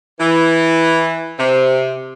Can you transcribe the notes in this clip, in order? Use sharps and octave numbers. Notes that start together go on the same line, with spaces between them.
E3
C3